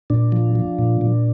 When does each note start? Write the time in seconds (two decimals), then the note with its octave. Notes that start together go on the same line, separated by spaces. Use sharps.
0.10 A#2 D4
0.32 F3
0.55 F3
0.79 A#2
1.01 A#2